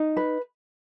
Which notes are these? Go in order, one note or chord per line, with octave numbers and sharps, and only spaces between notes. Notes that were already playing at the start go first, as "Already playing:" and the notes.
Already playing: D#4
B4